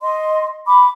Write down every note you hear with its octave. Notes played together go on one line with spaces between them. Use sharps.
D#5 C6
B5 D6